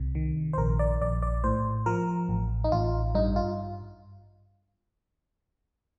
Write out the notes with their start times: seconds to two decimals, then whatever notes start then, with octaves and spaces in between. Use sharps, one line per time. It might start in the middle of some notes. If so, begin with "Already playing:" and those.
Already playing: C2 C3
0.15 D#3
0.53 C5
0.58 A#1 A#4
0.79 D5
1.01 A#1 D5
1.22 D5
1.44 A2 C5
1.86 F3 A#4
2.29 A1
2.64 D#4
2.72 A1 F4
3.15 G2 D#4
3.36 F4